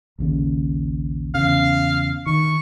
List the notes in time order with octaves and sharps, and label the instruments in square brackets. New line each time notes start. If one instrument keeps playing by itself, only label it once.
[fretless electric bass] A#1 D#2 C#3
[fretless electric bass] E2 C#3 [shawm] F5
[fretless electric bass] D#3 [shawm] C#6